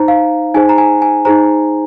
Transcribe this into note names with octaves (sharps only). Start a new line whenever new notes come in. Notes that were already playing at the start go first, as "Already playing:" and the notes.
Already playing: D#4 C5 A#5
F5
D#4 G#4 C5 G#5
A#5
G#5
G#5
D#4 G#4 C5 A#5